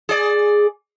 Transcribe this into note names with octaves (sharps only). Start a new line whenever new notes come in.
G#4 D5